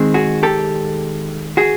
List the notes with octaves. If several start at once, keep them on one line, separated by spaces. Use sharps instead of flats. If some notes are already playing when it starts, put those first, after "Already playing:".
Already playing: D#3 G#3 C4
F#4 G#4
G4 A4
F#4 G#4